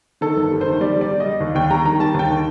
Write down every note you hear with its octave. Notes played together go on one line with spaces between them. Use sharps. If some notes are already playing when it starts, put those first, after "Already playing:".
D#3 A4
G1
G3
C5
D#3
G3 D5
G3
D5
G3
D#5
G3
D#2
D#2 G5
G3 A#5
D#3 A#5
G3 A5
D#2 G5
D#3